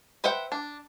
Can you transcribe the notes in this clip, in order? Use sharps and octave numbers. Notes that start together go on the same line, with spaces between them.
B4 C5 E5 F#5 G5
D4